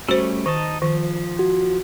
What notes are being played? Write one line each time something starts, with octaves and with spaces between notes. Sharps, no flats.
G3 A3 C#4 F#4 C5
D#3 D#4 D#5 A5
D#3 F3
F#4